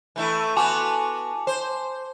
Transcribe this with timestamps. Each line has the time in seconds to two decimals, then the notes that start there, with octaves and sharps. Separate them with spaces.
0.16 E3 A3 E4
0.56 B3 F#4 G#5 A5 D6
1.47 C5